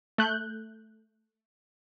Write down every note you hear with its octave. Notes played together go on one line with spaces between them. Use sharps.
A3 F#6 G6